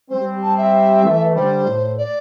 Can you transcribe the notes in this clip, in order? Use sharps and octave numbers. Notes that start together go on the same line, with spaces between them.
G3 C4 C5
A5
E5
E3 A3
D3 G3 C5
A2
D5